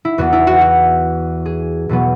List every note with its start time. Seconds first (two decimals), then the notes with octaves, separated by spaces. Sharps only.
0.05 E4
0.18 E2 E3 B3 F#4
0.33 E4
0.47 F#4
0.61 F#4
1.46 G#4
1.89 E2 B2 F#3 B3